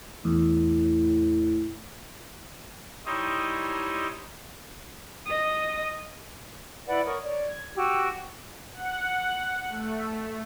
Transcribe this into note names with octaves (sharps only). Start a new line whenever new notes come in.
E2 A2
G3 D#4 E4 C5 C#5 D#5
D#5 D#6
E4 B4 D5 F#5
A#4 C#5 C#6 D#6
C#5 D5
G#6
F#4 G4 E6
F#5
A3